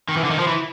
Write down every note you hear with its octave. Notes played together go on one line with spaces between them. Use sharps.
D#3
E3
D3
D#3
F3
E3